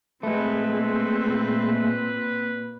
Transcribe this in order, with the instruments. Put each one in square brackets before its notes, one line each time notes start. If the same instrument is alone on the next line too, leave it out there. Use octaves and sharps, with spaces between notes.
[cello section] A#2 [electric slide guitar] G#3 A3 [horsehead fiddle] C4 [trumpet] B4